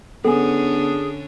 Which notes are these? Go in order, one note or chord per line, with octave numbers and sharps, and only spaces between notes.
D3 B3 C#4 D4 G#4 A4 G#5